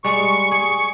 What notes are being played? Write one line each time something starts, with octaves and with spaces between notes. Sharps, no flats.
G3 G#3 C#6
G#4